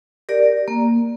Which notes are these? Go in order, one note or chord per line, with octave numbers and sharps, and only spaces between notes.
G4 A#4 D5
A#3